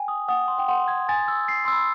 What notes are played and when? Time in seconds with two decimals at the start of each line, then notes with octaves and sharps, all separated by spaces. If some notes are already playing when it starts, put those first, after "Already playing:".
Already playing: G5 G#5
0.08 D#6
0.28 F#5 D#6
0.48 C6
0.58 G5
0.68 F#5 C6
0.88 G#6
1.09 G#5 A6
1.28 E6
1.48 C7
1.65 C6
1.68 B5 E6